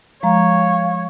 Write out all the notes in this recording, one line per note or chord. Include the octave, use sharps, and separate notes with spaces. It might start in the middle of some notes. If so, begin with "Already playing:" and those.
F3 G#3 C#5 F5 A#5